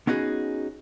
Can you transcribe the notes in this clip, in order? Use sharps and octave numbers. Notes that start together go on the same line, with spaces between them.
B3 C#4 D#4 F#4 G#4